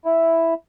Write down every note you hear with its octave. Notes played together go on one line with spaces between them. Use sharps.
E4